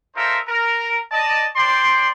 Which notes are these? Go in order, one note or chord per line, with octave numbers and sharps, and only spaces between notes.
D#4 F4 A4 A#4 C5 E5
A#4
D5 D#5 A5
D4 C5 D5 G5 C6